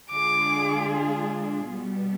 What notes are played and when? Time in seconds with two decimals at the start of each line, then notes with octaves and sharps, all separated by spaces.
0.10 D3 G#3 D4 F4 G#4 D6
1.70 B2 G3 B3